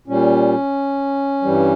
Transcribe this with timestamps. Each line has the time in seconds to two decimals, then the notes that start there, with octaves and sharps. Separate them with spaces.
0.07 A#2 G3 C#4
1.42 G2 E3 G3